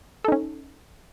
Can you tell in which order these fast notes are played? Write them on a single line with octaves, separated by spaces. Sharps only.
A4 D#4 C#4